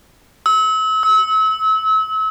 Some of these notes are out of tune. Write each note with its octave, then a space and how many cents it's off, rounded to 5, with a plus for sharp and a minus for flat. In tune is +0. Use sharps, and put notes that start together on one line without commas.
E6 -35
E6 -30